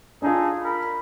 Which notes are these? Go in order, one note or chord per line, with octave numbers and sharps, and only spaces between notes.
D4 D#4 F4 G#4 A4
A#4 B5